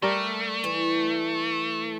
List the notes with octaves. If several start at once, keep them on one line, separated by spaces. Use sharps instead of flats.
G3 A3 A#4 D5
E3